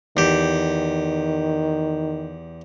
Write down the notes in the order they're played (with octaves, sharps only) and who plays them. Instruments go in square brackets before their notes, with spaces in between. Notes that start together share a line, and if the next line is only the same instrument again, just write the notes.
[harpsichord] E2 G4 [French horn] D#3